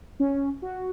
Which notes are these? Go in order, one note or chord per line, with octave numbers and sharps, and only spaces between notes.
C#4
F#4